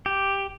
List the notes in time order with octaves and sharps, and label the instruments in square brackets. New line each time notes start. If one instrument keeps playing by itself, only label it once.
[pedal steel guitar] G4